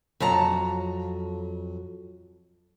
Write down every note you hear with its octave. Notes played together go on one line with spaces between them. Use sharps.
F2 F#3 A5 A#5